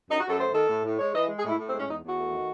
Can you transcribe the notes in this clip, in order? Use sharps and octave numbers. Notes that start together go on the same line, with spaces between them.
F#2 D#4
F#4
F#2 A4
A3 C5
D#3 A4
A2
A2
G#3 C#5
E3 D#5
G#3
G#4
A2
E4
A2
C4
G#3
C#4
E2 D#4
E2
F#4
A3
D#3